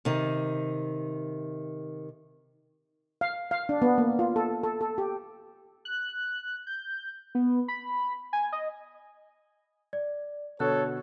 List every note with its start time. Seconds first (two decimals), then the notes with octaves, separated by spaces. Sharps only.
0.05 C3 D#3
3.21 F5
3.51 F5
3.69 D4
3.82 B3
3.98 A#3
4.19 F4
4.36 A4
4.63 A4
4.81 A4
4.98 G4
5.85 F#6
6.67 G6
7.35 B3
7.68 B5
8.33 G#5
8.52 D#5
9.93 D5
10.60 B2 D3 F#4 A4 C#5 F#6